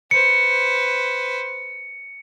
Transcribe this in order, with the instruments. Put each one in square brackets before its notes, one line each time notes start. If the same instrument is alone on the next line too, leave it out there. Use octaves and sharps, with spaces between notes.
[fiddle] B4 C5 [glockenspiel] C#7